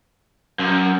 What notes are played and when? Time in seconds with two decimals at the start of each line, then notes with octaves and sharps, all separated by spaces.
0.59 F#2